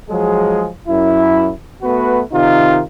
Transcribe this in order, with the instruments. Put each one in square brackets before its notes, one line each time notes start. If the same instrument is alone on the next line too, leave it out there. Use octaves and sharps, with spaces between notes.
[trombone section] F3 F#3 G#3 G#4
F#2 E4
A3 B3 F#4 B4
C3 D#3 D#4 F4